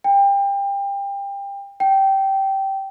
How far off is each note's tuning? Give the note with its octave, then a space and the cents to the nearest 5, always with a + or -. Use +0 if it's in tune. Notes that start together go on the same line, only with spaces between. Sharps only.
G5 +25
G5 -15